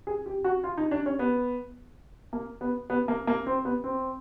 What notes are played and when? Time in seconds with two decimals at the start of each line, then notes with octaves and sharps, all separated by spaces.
0.07 G#4
0.26 G4
0.44 F#4
0.64 F4
0.77 D#4
0.91 D4
1.06 C#4
1.19 B3
2.33 A#3
2.61 B3
2.90 B3
3.08 A#3
3.27 A#3
3.46 C4
3.65 B3
3.84 C4